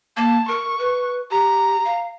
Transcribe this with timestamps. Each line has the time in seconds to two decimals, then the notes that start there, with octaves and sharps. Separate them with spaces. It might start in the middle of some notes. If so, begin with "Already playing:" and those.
0.17 A#3 A5
0.48 A#4 C#6
0.79 B4
1.31 G4 A#5
1.85 F5